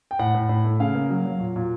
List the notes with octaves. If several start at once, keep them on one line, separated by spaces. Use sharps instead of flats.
G5
A2 F#5
A2
A2
A3
C#3 F5
A#3
F#3
F#3
A#2
A#2